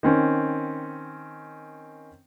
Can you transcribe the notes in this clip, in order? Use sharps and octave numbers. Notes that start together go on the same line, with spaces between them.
D#3 C4 C#4